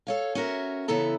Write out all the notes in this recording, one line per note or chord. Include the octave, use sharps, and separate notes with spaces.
A4 C#5 F5
C#4 F#4 A#4 E5
C#3 E3 B3 E4 A4 A#5